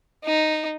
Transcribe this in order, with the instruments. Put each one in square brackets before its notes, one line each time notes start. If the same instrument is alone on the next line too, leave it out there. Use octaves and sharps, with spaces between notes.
[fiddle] D#4